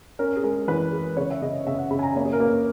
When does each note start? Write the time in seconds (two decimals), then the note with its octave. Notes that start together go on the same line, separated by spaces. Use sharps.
0.19 C#4 A#4
0.36 G#4
0.44 G#3 A#4
0.68 E3 B4
0.92 G#3
1.17 C#3 C#5
1.31 E5
1.42 C#3 D#5
1.67 C#3 E5
1.79 F#5
1.91 C#3 B5
1.99 G#5
2.03 A#5
2.16 A#3 C#5
2.25 G#4
2.33 A#4
2.40 A#3 B4